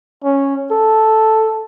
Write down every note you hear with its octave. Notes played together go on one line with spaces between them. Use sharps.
C#4
A4